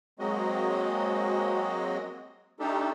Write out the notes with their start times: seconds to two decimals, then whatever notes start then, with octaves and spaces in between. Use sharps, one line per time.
0.19 F#3 G#3 A#3 C4 F#4 D#5
2.60 A3 D4 D#4 G4 A4